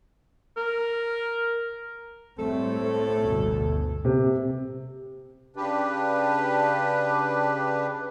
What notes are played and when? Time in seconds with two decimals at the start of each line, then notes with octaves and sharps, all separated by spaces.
0.57 A#4
2.38 A2 G3 A3 C4 A4
3.21 G1 D2 B2
4.05 C3
5.56 C#3 D4 G4 B4